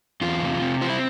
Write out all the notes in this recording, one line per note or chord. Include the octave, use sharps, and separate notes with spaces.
E2 F4
C3
C3
C4 F4
E4